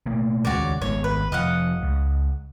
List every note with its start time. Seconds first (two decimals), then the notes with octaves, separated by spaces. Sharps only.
0.06 B2 A3 A#3
0.45 D#2 C#3 G#3 F#4 C#5 D5
0.81 G#1 G#3 B3 C#5
1.04 B4
1.32 F1 F3 D#5 F5 F#5
1.82 C#2